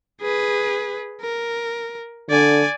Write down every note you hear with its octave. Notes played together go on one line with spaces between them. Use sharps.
G#4 B4
A#4
D3 D5 G#5